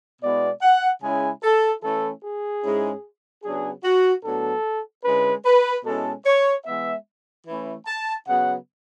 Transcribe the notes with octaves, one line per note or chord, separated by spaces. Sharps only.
B2 G#3 B3 E4 D5
F#5
C#3 G#3 C#4 E4 G#5
A4
E3 A3 C#4 E4 A4
G#4
G#2 G#3 C#4 E4
C#3 F#3 B3 D4 G#4
F#4
A2 F#3 B3 D4 A4
D3 G#3 C#4 E4 B4
B4
B2 G#3 C#4 E4 A4
C#5
E3 G#3 B3 E5
E3 A3 C#4 E4
A5
C#3 F#3 B3 F#5